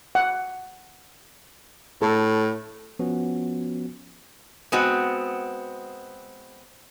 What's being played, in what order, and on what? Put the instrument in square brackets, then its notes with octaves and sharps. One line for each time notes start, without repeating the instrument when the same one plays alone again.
[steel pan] F#5
[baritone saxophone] A2 [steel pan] A4
[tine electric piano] F3 B3 C#4 F#4
[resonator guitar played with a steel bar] G#3 B3 C4 F#4